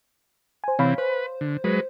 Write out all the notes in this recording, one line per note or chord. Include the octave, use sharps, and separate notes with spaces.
C5 G#5
C3 E3 C4 C#5 F5 B5
B4 C5
D3
F#3 G#3 B4